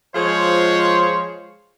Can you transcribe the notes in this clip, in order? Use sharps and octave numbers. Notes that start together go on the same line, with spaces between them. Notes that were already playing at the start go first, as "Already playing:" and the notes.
F3 G#3 F4 G#4 C5 C#5